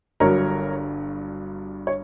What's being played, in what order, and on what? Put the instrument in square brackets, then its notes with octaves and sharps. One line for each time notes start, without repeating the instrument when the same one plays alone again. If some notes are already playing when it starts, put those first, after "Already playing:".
[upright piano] G1 G2 F#3 A#4 C#5
C#5